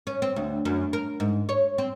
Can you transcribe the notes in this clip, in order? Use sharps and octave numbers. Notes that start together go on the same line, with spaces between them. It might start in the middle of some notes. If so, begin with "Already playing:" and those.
C#4
C4
D2
F#2
A#4
G#2
C#5
C4